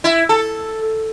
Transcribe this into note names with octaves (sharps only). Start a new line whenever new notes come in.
E4
A4